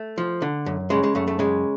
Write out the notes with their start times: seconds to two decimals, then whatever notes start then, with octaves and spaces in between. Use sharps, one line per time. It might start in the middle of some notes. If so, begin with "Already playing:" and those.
Already playing: A3
0.18 F3
0.42 D3
0.66 F#2
0.90 C#3 G#3
1.03 G#3
1.15 F#2 A3
1.28 A3
1.39 C#3 G#3